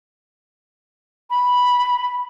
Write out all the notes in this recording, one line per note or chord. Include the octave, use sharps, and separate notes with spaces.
B5